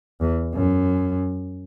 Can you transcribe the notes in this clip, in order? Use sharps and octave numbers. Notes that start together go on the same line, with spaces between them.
E2
F#2